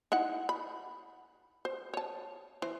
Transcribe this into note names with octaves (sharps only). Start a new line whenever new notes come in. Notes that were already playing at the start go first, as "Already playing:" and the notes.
D#4 E4 F#5
B5
C5
C#5 A5
E3 C5